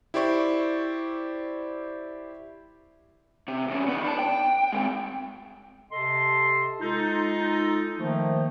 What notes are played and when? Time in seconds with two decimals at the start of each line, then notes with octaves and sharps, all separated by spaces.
0.14 E4 G4 C5 D5 C#6
3.48 C3
3.68 E2 C#3
3.88 D#3 B3
4.04 D4 A5
4.19 G5
4.73 G#3 C4
5.92 C3 A4 D#5 A5 C6
6.81 G#3 D#4 F4 A4
7.99 D#3 F3 A3 A#3